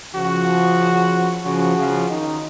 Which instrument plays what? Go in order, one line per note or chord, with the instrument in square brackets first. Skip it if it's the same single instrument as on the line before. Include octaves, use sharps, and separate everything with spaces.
[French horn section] C#3 F3 [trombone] F#4
[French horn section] C#3 F3 [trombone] F#4
[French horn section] C#3 F3
[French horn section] D#3 [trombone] D#4